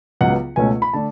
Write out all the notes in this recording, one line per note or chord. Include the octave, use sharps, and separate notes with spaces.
C#2 C#3 F#3 B3 F#5
C#2 B2 A3 C#4 G#5
B5
D3 A3 D4 A5